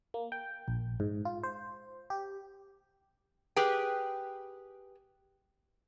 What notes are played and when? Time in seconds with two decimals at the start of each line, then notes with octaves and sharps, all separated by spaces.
0.14 A#3
0.32 G5
0.68 A#1
1.00 G#2
1.25 F4
1.44 C5
2.10 G4
3.56 G4 G#4 B4 G5